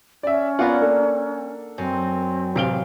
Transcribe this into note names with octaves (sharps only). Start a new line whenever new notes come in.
C#4 D5 E5
B3 F4 A#4 D5 F#5
A#3 D4 A4
F#2 C4
A1 C3 F5 D7 G7